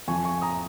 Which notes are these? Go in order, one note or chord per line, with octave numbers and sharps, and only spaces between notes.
F2 F3 G#5 C#6
G#5 C#6
A#5 D#6